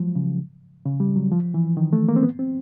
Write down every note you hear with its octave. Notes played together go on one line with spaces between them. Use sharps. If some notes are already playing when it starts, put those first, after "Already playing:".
Already playing: F3 F#3 G#3
C#3
C#3
G3
F#3
F3
E3
D#3
A3
A#3
C4
B3
C4